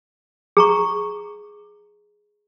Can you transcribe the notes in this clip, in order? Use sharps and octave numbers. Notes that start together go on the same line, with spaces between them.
G#4 A#5 C#6